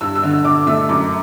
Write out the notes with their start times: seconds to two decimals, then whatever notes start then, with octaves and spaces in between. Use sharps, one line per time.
0.01 G2 E6
0.16 E6
0.23 D3
0.30 E6
0.45 D3 D6
0.67 A3 E6
0.89 F#2 D6